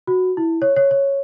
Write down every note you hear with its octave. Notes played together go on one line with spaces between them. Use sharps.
F#4
E4
C#5
C#5
C#5